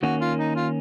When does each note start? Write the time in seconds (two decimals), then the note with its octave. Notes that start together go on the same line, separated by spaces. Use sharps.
0.03 D#3 A#3 C#4 F#4
0.21 F4
0.39 D#4
0.56 F4